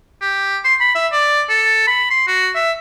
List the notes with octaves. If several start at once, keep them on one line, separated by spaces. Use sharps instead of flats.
G4
C6
B5
E5
D5
A4
B5
C6
F#4
E5